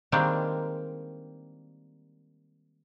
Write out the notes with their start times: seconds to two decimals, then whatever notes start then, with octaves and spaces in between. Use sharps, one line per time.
0.12 D#3 G3 G#3 A#3 C4 D4